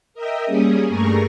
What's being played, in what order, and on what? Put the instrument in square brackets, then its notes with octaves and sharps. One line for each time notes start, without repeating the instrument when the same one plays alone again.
[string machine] A#4 D#5 E5 G5
G3 A#3 C#4 G#4 D#6
G2 A3 G#4 A#4 A#5 C#6